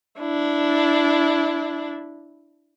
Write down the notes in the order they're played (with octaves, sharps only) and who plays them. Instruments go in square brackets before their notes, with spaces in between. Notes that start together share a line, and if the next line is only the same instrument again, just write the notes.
[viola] D4 E4